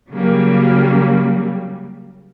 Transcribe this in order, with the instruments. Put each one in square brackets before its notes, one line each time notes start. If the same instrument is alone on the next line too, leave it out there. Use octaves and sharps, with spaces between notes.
[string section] C#3 F#3 G3 A#3